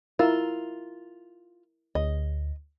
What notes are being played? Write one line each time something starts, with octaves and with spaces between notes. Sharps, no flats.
E4 F4 A#4 E6
D2 D#5